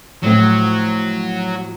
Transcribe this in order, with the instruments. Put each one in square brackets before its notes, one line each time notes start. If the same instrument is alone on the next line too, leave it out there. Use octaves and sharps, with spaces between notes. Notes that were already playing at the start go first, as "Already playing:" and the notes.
[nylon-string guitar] A2 F3 A3 C4 [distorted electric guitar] F#3